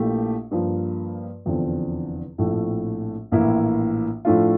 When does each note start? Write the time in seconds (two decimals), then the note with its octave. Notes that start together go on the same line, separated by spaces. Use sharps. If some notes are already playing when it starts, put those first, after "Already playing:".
Already playing: A#1 A#2 A3 E4 G4
0.51 G2 F3 A#3
1.46 F1 E2 D3 F3 C4
2.38 A#1 A2 F3 A3 C4
3.32 A#1 A2 E3 A#3 E4
4.25 A2 F3 A3 D4 F4